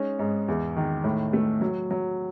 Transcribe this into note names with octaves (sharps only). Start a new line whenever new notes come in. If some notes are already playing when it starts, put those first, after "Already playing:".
Already playing: G#3 C#4 D#4
G#2
E2
D#3
A2
A3
F#3
F#3